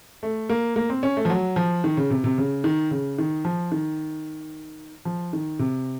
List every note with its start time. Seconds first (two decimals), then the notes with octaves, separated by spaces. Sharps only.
0.23 A3
0.49 A#3
0.76 A#3
0.90 C4
1.03 C#4
1.17 A3
1.25 F3
1.30 F#3
1.56 F3
1.84 D#3
1.97 C#3
2.10 C3
2.24 C3
2.38 C#3
2.64 D#3
2.91 C#3
3.18 D#3
3.45 F3
3.72 D#3
5.05 F3
5.33 D#3
5.59 C3